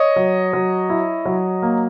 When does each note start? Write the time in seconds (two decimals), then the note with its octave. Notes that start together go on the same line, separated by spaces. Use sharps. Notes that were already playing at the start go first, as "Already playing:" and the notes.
Already playing: C#5 D#5
0.16 F#3
0.53 F#3
0.89 E4
1.26 F#3
1.62 A#3